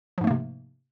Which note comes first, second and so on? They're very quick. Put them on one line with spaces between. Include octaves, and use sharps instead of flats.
F3 G#2 A3 A#3 C3